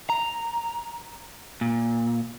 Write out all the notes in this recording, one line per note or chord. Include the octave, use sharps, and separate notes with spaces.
A#5
A#2